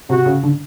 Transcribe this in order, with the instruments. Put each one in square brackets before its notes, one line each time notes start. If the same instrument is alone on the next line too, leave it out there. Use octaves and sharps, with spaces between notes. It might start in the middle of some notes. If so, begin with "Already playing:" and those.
[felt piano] C3 [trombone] F#4
[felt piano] C#3
D3